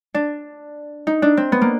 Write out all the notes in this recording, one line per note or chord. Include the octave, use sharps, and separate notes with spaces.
D4
D#4
D4
C4
B3
A#3